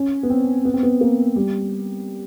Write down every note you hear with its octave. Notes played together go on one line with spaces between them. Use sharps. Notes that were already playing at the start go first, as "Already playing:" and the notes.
Already playing: C#4
B3
C4
B3
C4
B3
A#3
G3